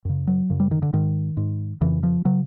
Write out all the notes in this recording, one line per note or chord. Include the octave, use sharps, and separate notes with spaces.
F#2 C#3
F#3
F#2 C#3
G3
D#3
D3
G#2 D#3
G#2
F2 C#3 E3
F3
C#3 F#3